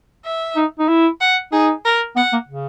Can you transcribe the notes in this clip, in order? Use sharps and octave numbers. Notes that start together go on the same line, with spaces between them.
E5
D#4
D#4
E4
F#5
D#4 G#4
A#4
B3 F#5
A#3
C#3